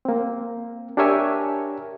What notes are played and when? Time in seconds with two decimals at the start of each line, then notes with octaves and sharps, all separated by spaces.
0.05 A#3 C4
0.97 D4 G4 A#4 C#5 E5 G#5